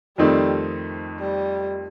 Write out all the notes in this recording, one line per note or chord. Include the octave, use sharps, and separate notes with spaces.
F2 D#3 G3 A3 C4 D#4
G3